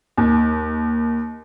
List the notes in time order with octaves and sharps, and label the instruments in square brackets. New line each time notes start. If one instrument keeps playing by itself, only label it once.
[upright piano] D#2